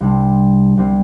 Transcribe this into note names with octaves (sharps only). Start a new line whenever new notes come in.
C2 C3 G3 D4
C2 C3 G3 C4